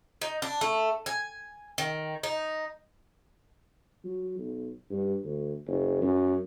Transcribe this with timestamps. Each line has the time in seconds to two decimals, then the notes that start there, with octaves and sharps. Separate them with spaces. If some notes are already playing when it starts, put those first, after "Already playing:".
0.21 D#4
0.42 D4
0.61 A3
1.06 G#5
1.78 D#3
2.23 D#4
4.05 F#3
4.39 B1
4.91 G2
5.24 D2
5.67 F#1
6.02 F#2